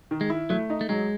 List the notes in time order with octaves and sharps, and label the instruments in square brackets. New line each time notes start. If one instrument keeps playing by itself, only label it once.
[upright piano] D#3
[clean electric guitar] G#3
[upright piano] E4
[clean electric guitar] F#3 [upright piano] A3
[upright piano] D#4
[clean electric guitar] A3
[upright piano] F#3 [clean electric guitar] G#3